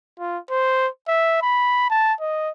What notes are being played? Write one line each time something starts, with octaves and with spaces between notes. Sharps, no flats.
F4
C5
E5
B5
A5
D#5